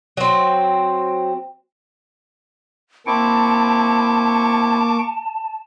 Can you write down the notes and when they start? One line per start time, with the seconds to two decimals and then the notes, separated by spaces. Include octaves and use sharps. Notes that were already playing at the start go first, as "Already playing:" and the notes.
0.17 F#3 C4
3.07 A#3 C4 E4 A5 C#6 D6